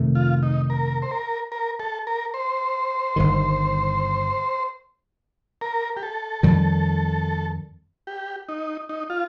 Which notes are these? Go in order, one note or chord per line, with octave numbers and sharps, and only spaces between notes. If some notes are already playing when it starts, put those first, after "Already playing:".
Already playing: F2 C3 D#3 A3
F4
D#4
A#4
C5
A#4
A#4
A4
A#4
C5
G1 G2 D#3
A#4
G4
A4
F2 D#3 G3
G4
D#4
D#4
F4